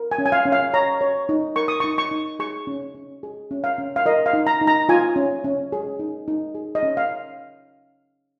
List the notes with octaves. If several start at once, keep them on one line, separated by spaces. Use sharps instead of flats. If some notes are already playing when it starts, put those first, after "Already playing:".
Already playing: A#4
G#5
C#4
G#5
F5
C#4
F5
C#5 A#5
C#5
D#4
A#4 C#6
D#6
D#4 C#6
C#6
D#4
G#4 C#6
C#4
C#4
G#4
C#4
F5
C#4
F5
A#4 D#5
F5
D#4
A#5
D#4
A#5
F4 G#5
C#4
C#4
G#4
D#4
D#4
G#4
D#5
C#4
F5